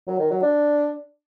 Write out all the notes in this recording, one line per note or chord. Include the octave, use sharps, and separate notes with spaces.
F#3
D#3
F#3
D4